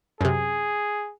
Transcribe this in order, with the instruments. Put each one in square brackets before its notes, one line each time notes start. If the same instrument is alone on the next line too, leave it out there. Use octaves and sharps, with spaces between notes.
[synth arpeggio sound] F#2 C3 [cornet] G#4